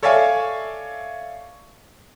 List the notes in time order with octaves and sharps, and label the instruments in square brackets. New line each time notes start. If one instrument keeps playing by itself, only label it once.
[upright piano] A4 C#5 D5 E5 F5 G#5